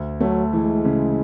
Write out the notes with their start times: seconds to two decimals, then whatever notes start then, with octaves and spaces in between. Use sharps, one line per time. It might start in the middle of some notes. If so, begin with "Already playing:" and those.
Already playing: D2
0.20 F#3 A3
0.52 E3 G#3
0.85 C#3